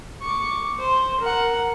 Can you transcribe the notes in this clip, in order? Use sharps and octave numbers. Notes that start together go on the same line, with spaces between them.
C#6 D6
C5
A#4 F#5